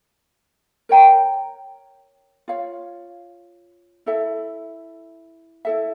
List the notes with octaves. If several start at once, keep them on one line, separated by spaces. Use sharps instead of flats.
A#4 C#5 G5 A#5
F4 C#5 F5
E4 A4 E5
E4 A4 E5